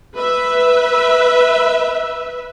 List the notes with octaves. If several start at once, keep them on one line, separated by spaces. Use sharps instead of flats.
B4 E5